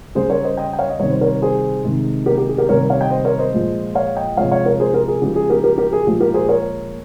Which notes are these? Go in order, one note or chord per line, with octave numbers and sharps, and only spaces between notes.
C#3 G3 G#4 C5
A#4 C#5
C5 D#5
D#5 G5
G5
C#5 F5
D#5
C3 D#3 G3 C#5
C5
A#4 C#5
G#4 C5
C3 D#3 G#3
G4 A#4
G4
G#4
G4 A#4
C3 D#3 G3 A#4 C#5
C#5 F5
D#5 G5
C5 D#5
A#4 C#5
C5 D#5
A#2 F3 G#3
C#5 F5
D#5 G5
C3 F3 G#3 C#5 F5
C#5 F5
A#4 C#5
G#4 C5
G4 A#4
G#4
C#3 F3 G#3 G4
G#4
G4 A#4
G4 A#4
G4 A#4
G#4
A#2 F3 G#3 G4
G4 A#4
G#4 C5
A#4 C#5